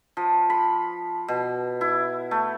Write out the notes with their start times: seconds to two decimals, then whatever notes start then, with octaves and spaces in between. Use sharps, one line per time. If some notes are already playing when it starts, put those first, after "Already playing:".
0.17 F3
0.50 B5
1.28 B2
1.81 E4
2.31 A3